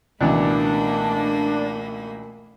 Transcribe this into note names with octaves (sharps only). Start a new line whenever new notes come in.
C#2 B2 E3 A3 A#3 D4 B5